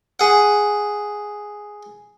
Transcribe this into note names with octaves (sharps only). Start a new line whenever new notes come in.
G#4 F#5